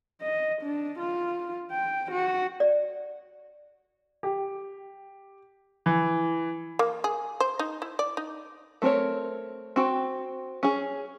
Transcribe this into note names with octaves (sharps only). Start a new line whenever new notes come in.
D#5
D4
F4
G5
F#4
D5
G4
E3
A#3
G#4
C5
D#4
E4
D5
D#4
A3 C4 G#4 A#4 C#5
C4 F#4 G5
C#4 G#4